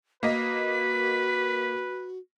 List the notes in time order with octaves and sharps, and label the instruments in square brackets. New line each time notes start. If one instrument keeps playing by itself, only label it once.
[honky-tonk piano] A#3 A#4 D#5 [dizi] F#4 [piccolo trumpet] B4 [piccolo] B6